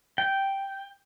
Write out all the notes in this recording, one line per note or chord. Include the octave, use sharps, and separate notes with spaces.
G5